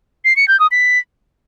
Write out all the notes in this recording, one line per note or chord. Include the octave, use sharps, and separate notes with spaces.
C7
C#7
G6
D#6
B6